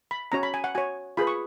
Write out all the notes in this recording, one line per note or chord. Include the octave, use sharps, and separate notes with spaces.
B5
C#4 F#4 C#5 A#5
B5
G#5
F#5
F#4 C#5 G#5
F4 G#4 B4 B5
C#6